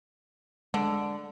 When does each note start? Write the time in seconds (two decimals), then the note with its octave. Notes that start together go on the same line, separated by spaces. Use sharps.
0.74 D3 G#3